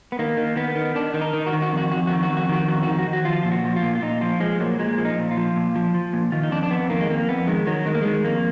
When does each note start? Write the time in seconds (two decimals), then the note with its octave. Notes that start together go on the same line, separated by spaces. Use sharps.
0.12 B3
0.19 D#3 A#3
0.37 D#3
0.56 D#3 B3
0.76 D#3
0.95 D#3 D4
1.14 D#3
1.21 D#4
1.33 D#3
1.46 F#4
1.53 D#3
1.62 F#4
1.73 F2 F#4
1.91 F2 F#4
2.07 F#4
2.10 D#3
2.23 F#4
2.29 F2
2.37 F#4
2.49 D#3 F#4
2.68 F2 F#4
2.83 F#4
2.87 D#3
2.99 F#4
3.07 D#3
3.13 F#4
3.25 F3 F4
3.43 A#2 F4
3.52 F#4
3.64 F3
3.76 F4
3.83 A#2
3.95 F4
4.02 A#2 D#4
4.21 F3 F4
4.40 F3 G#3
4.60 A#2 F#3
4.79 A#2 G#3
4.98 F3
5.05 D#4
5.18 A#2
5.31 F4
5.37 F3
5.56 A#2
5.76 F3
5.94 F3
6.13 A#2
6.32 D#3 F4
6.43 D#4
6.51 F2 D4
6.63 D4
6.71 F2 B3
6.90 D#3 A#3
7.00 G#3
7.10 F2 A#3
7.29 F2 B3
7.48 D#3 G#3
7.67 D#3 F#3
7.86 D#3 G#3
7.94 A#3
8.02 D#3 G#3
8.25 F2 A#3